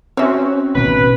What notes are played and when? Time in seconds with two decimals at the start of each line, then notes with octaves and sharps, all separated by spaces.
0.17 C4 C#4 F#4 C#5 E5
0.75 A1 B2 D#3 B4